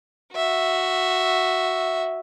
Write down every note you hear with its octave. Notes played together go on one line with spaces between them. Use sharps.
F#4 E5